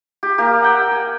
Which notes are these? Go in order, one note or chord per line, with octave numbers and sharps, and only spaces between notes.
G4
A#3 G4 A#4 F5
F#5 G5 E6
G#5